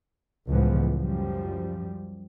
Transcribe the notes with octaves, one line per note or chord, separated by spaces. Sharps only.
C#2 A2 E3 F3 B3
F#2 F3 G3